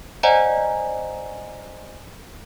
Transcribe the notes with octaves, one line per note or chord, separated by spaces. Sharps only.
C5 D5 D#5 F#5 G#5 A#5